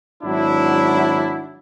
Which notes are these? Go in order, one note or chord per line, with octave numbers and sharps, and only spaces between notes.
G#1 F#3 D4 E4